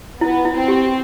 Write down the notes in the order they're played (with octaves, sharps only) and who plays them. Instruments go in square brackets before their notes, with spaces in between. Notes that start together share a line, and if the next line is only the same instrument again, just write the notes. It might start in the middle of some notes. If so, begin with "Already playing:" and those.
[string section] B3 [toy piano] E4
[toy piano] E4
[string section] C4
[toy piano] G4